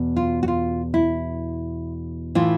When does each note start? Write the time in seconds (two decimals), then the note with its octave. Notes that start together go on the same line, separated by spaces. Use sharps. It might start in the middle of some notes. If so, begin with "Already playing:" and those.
Already playing: E2 B2
0.16 F4
0.43 F#4
0.48 F4
0.94 E4
2.35 A2 E3 F4